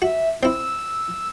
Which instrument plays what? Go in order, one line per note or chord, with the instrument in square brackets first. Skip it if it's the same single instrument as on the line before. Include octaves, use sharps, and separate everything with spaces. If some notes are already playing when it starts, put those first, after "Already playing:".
[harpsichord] F#4 [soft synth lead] E5
[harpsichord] C4 E4 [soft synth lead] E6